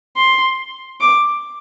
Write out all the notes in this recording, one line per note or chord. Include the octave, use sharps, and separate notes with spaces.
C6
D6